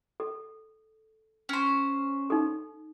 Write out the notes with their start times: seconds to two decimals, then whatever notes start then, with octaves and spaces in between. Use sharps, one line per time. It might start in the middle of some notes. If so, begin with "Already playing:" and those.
0.20 A4
1.49 C#4 C5
2.30 D#4 A4